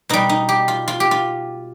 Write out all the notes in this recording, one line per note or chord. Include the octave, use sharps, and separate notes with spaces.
B2 G3 D#4
D#4
G4
F4
F4
G4
F4